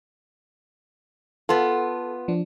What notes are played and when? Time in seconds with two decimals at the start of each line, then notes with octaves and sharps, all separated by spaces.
1.49 B3 F4 A4
2.28 F3 D4